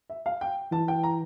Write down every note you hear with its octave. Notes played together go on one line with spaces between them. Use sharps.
E5
F5
G5
E3 A5
G5
A#5